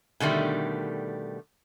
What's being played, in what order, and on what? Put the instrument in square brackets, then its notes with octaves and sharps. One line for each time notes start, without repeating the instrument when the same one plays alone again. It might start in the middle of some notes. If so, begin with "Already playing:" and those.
[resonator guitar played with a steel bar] B2 D3 D#3 G3 A3